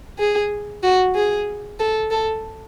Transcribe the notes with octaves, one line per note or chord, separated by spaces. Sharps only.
G#4
F#4
G#4
A4
A4